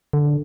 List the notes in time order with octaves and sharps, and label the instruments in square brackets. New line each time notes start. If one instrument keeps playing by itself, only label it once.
[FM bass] D3